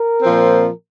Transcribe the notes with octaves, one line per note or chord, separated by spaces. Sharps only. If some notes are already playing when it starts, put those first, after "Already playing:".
Already playing: A#4
A#2 F3 C4